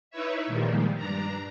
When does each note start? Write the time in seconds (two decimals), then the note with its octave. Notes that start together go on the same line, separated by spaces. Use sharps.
0.11 D#4 E4 B4 C#5 E5
0.47 A#2 D#3 F3 G3 G#3
0.96 G2 D4 A#5